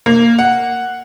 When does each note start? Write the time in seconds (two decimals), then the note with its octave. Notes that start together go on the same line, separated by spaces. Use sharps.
0.06 A#3
0.39 F#5